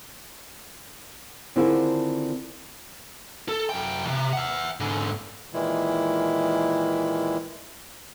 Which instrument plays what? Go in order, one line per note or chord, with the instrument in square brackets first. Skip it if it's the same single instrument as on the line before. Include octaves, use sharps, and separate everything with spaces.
[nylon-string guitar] D3 D#3 C4 E4 F4 G#4
[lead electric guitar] A4
F#2 G5
C2 C3
E5 F#5
G#2 D3
[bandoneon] A#2 D#3 E3 G#3 E4